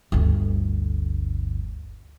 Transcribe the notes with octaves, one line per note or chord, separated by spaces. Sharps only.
G1 D2